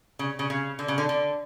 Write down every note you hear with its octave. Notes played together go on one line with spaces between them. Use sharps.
C#3
C#3
C#3
D3
C#3
D3
D3